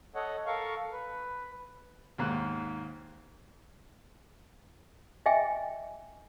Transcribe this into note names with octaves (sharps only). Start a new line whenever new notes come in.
A4 C#5 D#5 F#5
A4 A#4 F5 C#6
B4
D#2 G#2 A#3 F#6
D#5 E5 G5 G#5